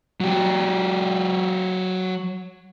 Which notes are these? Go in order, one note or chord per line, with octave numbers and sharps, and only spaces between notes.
F#3 G4